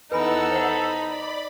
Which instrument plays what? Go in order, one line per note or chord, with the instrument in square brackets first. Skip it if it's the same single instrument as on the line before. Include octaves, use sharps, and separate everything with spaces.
[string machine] E2 F#5 E6 [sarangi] D#4 [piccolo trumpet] A4 [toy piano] B4 G#5 B5
[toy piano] C5 F#5 [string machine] B5
[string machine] D5 B5